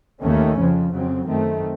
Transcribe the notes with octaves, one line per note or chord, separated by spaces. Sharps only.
D#2 D#3 A3 C#4
F2 C#3 F3
F2 C#3 F#3 C4
F#2 D#3 A3 C4